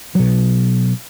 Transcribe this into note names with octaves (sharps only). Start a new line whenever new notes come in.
B2 F#3